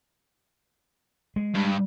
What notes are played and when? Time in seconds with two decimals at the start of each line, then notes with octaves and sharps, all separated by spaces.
1.36 G#3
1.55 G2